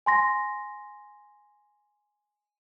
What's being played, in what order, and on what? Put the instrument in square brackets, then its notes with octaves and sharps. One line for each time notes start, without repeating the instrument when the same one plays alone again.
[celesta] G#5 C6 A#6